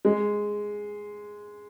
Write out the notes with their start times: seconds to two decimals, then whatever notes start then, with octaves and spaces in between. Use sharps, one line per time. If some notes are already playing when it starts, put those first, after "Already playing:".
0.05 G#3